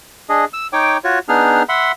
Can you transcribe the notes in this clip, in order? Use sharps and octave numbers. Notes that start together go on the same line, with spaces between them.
D4 G#4 D#5
E6
D#4 C#5 G5 D6
F4 F#4 C#5
B3 D4 D#4 G#4 F6
E5 F#5 B5 C6